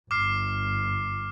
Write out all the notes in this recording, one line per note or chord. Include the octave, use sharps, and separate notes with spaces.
G1 D6 F6 C7